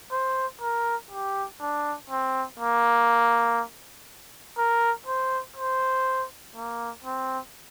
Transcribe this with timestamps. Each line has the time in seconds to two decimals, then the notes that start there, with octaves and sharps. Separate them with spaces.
0.12 C5
0.62 A#4
1.11 G4
1.61 D4
2.10 C4
2.59 A#3
4.58 A#4
5.06 C5
5.56 C5
6.56 A#3
7.04 C4